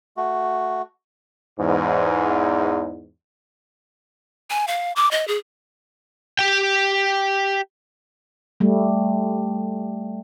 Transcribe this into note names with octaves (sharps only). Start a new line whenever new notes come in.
A3 F#4
E2 G#2
G#5
F5
D6
D#5
G#4
G4 G5
G3 A3